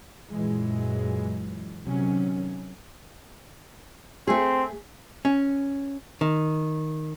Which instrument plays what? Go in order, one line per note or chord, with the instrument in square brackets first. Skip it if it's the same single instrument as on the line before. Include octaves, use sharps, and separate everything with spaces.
[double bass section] F#2 A#2 E3 F#3 G#3
C3 D#3 F#3 C#4
[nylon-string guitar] A3 G#4 [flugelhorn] C4
[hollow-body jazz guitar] C#4
D#3